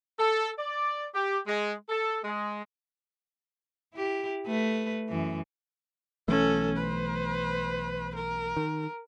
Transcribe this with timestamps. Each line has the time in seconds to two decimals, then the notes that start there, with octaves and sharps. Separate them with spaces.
0.18 A4
0.59 D5
1.14 G4
1.47 G#3
1.89 A4
2.24 G#3
3.94 E4 G4
4.47 A3 B4
5.09 F#2 E3
6.28 B1 E3 A3 C#4 A4
6.77 B4 C5
8.16 A#4
8.57 D#3